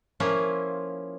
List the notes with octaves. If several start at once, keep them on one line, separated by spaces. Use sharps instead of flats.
F3 A#3 C#4 E4 F4